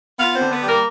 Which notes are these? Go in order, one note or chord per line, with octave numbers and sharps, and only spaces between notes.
B3 F4 F5
D3 C4 C5
B3 B4
G3
A#3 A#4